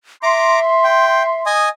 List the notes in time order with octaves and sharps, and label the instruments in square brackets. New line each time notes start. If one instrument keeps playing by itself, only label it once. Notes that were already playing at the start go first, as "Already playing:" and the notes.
[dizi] E5 [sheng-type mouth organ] A#5 D6 [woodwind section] C6
[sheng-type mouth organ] G5
D#5 G#5 D#6